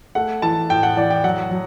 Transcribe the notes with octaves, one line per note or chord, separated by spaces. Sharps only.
A3 F#5
E3 A5
A2 G5
F#5
E3 D5
G5
F#3 F#5
F#3